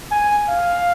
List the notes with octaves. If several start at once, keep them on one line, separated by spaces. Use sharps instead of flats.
G#5
F5